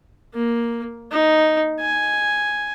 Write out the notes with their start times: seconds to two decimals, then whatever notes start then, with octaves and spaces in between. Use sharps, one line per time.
0.34 A#3
1.12 D#4
1.80 G#5